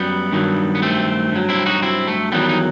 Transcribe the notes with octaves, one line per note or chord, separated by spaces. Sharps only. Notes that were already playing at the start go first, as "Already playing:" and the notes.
Already playing: F#2 F#3 G3 B3
G2 D#3 F#3
B3
A3 C4
G2 F#3
C4 E4
D#4 F#4
C4 E4
A3
E2 D#3 F#3 G3 B3
D#4